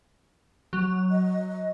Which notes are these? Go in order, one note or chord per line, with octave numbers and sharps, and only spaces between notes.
F#3
D#5